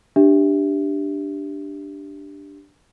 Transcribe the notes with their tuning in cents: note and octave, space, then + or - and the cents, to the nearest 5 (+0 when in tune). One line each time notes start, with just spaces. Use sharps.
D4 +0 G4 +0 E5 +0